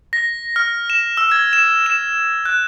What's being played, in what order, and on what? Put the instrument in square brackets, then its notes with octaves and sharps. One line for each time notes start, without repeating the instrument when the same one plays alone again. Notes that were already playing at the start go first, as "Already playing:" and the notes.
[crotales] A#6
F6
E7
E6
G#6
E7
E7
F#6